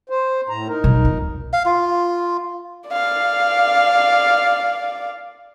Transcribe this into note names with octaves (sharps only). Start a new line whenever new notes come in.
C5
A2 A#5
D#4 A#4
B1
F2
F5
F4
D5 F5